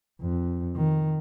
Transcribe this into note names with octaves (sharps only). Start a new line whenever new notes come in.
F2
D#3